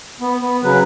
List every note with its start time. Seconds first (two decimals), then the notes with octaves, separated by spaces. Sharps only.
0.21 B3
0.42 B3
0.63 C#3 F#3 B4